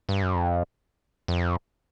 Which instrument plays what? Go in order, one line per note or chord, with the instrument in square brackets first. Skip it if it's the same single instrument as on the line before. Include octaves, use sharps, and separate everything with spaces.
[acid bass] G2
F#2
F2
F2